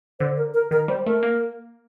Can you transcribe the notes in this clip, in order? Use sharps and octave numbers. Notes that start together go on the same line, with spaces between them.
D3 C5
A#4
A#4
D#3 A#4
G3 C5
A3 A#4
A#3